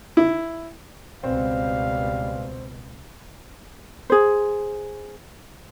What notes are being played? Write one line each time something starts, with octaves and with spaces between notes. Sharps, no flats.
E4
C#2 B2 G3 C4 F5
G#4 C5